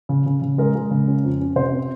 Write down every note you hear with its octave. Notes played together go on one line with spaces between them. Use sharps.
C#3
C#3
C#3
G#3 A#4
G#3
C#3
C#4
F2
C#4
C3 C5
C4